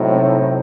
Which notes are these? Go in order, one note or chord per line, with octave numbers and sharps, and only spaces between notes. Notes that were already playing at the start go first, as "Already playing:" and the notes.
Already playing: A2 C3 F#3 C4 D#4
C3